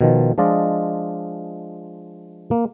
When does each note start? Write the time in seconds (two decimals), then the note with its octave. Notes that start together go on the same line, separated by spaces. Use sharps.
0.01 B2 D#3 F3
0.38 F3 G#3 D4 F4 D5 D#5
2.51 A#3